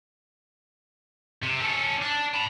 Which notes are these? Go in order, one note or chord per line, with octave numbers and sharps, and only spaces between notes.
C3
C#4 A4
D4
A5 B5